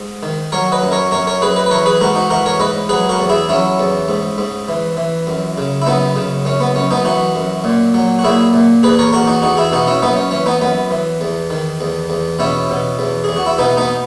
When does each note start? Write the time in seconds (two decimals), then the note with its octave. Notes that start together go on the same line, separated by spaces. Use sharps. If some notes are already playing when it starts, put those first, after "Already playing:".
Already playing: G#2
0.23 D#3
0.52 F#3 A#4 C#5
0.72 B4 D#5
0.82 F#2
0.92 A#4 C#5
1.11 F#2 A#4 C#5
1.27 A#4 C#5
1.41 F#2 G#4 B4
1.56 B4 D#5
1.66 B4
1.71 E3 A#4 C#5
1.86 G#4 B4
2.00 G#2 F#4 A#4
2.15 D#4 F#4
2.30 E3 F#4 A#4
2.46 A#4 C#5
2.60 G#2 B4 D#5
2.89 F#3 G#4 B4
3.09 F#4 A#4
3.19 E2
3.29 E4 G#4
3.49 F#3 C#4 E4
3.80 E2
4.09 G#2
4.38 G#2
4.69 E3
4.97 E3
5.27 F#2
5.58 C#3
5.82 E4
5.86 F#2 B3 D#4
6.16 C#3
6.45 F#2 C#4
6.60 B3
6.75 F#2 C#4
6.91 B3 D#4
7.05 E3 D#4 F#4
7.36 F#2
7.64 A#2
7.94 F#3
8.19 F#4
8.24 A#2 E4 G#4
8.53 A#2
8.83 E2 G#4 B4
8.99 A#4 C#5
9.13 E2 F#4 A#4
9.27 D#4 F#4
9.42 E2 D#4 F#4
9.57 E4 G#4
9.72 B2 D#4 F#4
9.87 C#4 E4
10.02 F#2 B3 D#4
10.17 C#4
10.31 E3 C#4
10.46 B3 D#4
10.61 F#2 B3
10.91 E3
11.21 E2
11.50 D#3
11.81 E2
12.10 E2
12.39 B2 C#4 E4
12.70 B2
12.99 E2
13.24 E2 G#4
13.36 F#4
13.46 E4
13.58 B2 B3 D#4
13.77 B3 D#4